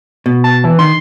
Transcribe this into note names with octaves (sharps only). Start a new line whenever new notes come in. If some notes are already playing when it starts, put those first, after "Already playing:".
B2
A5
E3
D#3 C6